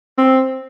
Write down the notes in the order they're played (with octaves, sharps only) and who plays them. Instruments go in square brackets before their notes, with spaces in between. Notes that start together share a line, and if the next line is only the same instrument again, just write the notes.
[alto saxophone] C4